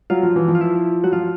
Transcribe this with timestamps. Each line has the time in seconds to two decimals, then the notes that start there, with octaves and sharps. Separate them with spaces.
0.10 F#3 F4
0.23 F3
0.36 E3
0.48 F3
0.55 F4
0.61 E4
1.03 F#3 F#4
1.13 F3 F4